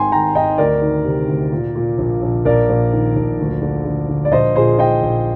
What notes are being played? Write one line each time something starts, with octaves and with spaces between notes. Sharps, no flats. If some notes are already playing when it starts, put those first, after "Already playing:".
Already playing: G#1 G#2 G5 G#5 C6
D#3 G5 A#5
G#1 D#5 G5
D2 A#4 D5
D#3
C3
D2
A#2
A#2
A#1
A#1
A#1 A#4 D5
A#1
D#3
A#1
D2
D3
D3
D3
D5
A#1 C5 D#5
A#2 G#4 C5
A#2 D#5 G5
A#1